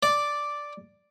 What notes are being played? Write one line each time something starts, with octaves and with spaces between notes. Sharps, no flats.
D5